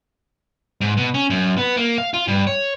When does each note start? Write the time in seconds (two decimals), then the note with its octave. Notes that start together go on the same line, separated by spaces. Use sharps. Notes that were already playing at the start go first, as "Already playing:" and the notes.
0.81 G#2
0.97 B2
1.14 C#4
1.30 F#2
1.58 B3
1.77 A#3
1.98 F5
2.14 F4
2.28 G2
2.47 C#5